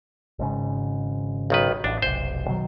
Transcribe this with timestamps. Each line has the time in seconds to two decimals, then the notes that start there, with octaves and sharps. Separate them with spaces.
0.39 G#1 G#2 C#3
1.50 B1 D#3 B4
1.84 A1 D4
2.02 F1 B1 C5
2.48 B2 D#3 F#3